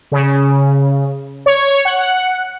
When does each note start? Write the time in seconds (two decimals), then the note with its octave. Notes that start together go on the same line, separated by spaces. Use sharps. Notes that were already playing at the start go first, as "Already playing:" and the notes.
0.12 C#3
1.46 C#5
1.85 F#5